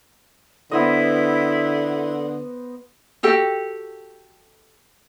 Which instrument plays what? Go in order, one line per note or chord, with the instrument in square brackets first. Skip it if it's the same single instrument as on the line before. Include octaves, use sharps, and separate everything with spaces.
[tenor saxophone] D3 [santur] B3 C5 D#5 [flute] E4
[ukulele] F#4 G4 A4 G5